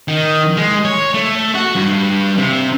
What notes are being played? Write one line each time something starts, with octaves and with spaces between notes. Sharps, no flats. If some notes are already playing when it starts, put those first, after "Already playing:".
D#3
G#3
C#5
A3
F#4
G2
C3